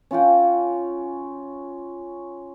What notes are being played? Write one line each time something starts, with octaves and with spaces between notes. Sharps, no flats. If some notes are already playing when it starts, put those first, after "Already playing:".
C#4 F4 F#5 G5